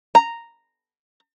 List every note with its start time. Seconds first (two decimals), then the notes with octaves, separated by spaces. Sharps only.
0.15 A#5